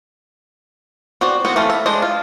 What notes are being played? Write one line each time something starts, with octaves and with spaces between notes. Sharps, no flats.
C4 F#4 D5
B3 C4 F#4
E3 A3 F4
E5
G#3 D4 C5 D#5
F4